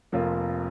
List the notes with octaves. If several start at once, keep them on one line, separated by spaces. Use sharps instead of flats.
F1 F2 F3 A#3 F4